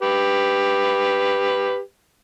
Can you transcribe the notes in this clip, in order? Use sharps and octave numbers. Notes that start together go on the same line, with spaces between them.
G4 B4